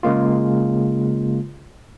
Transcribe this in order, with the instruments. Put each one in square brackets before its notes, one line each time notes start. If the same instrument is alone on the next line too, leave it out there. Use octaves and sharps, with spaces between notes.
[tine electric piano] C#3 G#3 A#3 F4